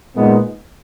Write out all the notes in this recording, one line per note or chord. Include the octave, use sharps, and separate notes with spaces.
A#2 G#3 B3 D#4